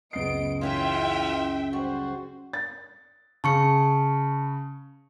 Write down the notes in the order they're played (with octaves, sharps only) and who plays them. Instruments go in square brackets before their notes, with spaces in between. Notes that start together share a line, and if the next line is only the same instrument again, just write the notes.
[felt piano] C#2 F#2 C7 [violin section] B3 D7 [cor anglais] D#5
[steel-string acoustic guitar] E3 C#4 D#4 [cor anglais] F4 [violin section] E5 G5
[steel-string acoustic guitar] G3 [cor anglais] F#4 [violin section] C5
[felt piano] A6
[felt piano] C#3 [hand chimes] A5 C#6 C#7